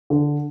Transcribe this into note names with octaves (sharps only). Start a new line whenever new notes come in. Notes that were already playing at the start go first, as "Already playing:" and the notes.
D3